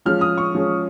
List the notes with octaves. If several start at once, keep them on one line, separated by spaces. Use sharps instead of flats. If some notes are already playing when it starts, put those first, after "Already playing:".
F3 G#3 C#4 F6
D#6
C#6
F3 G#3 C#4